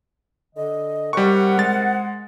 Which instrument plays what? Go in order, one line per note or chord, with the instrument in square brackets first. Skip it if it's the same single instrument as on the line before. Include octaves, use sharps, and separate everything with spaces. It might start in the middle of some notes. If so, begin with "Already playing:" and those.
[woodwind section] D3 D#5
[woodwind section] C3 A#4 F#5 [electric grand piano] G3 C#6
[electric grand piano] G#3 A6